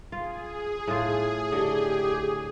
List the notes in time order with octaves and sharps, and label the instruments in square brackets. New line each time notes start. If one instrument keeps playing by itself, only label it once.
[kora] F4 [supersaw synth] G#4
[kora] A2 F4
[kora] D3 D#5 [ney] G4